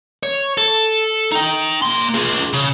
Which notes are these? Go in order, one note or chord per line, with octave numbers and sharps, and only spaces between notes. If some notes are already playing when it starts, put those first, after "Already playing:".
C#5
A4
D#4 G5
A#3 C6
F4 G#4
C#3